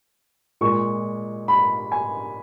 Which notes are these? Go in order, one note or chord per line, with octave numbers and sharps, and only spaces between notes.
A#2 G#3 C#6
B5
G#5